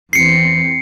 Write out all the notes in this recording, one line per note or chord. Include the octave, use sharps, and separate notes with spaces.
E2 E3 C4 C7 C#7